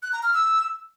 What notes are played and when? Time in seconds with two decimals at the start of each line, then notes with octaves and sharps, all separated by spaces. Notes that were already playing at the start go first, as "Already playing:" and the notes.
0.03 F#6
0.13 A#5
0.23 F6
0.33 E6